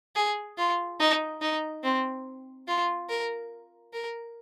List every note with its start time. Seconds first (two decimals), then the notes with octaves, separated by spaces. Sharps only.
0.16 G#4
0.58 F4
1.00 D#4
1.41 D#4
1.83 C4
2.68 F4
3.09 A#4
3.93 A#4